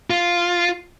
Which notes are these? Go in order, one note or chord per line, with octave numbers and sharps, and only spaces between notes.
F4